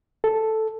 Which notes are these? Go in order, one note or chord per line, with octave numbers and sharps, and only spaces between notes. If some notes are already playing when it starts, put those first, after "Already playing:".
A4